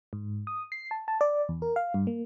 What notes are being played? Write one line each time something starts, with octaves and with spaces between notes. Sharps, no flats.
G#2
D#6
C7
A5
A5
D5
E2
A#4
F5
G2
A#3